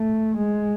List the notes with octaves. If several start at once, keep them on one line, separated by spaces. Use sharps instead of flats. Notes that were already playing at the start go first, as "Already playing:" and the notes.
Already playing: A3
G#3